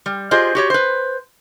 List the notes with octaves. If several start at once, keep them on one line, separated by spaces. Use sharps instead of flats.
G3
F4 G4 G#4 C5 D#5
F#4 G4 C#5
B4 C5